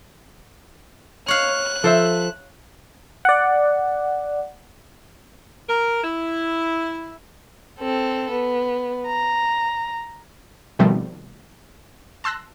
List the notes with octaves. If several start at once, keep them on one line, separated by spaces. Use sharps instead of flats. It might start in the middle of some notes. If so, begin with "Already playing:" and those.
C#5 F5 F#6
F3 A4 C5 E5
D5 F#5
A#4
E4
C4 A4
B3
A#5
B2 D#3 F3 G3 A3 C4
A5 C6 E6 F#6 A#6